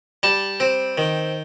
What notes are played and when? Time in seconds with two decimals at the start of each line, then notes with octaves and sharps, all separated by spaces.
0.23 G3 A5
0.60 C4
0.98 D#3